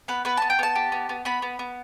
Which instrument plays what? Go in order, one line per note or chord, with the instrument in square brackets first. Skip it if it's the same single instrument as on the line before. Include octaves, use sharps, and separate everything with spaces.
[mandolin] B3 B4
B3 B4
B3 A5
G5
B3 A5
G4
B3
B3
B3 B5
B3
B3